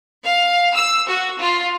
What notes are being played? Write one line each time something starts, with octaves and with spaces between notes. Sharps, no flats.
F5
E6
F#4
F4